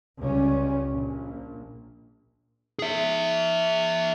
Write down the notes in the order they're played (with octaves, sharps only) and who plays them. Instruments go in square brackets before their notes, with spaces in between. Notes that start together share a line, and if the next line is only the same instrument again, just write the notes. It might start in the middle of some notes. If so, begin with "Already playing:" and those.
[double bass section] C#2 C#3 G3 C#4
A#1
[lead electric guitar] G#4 E5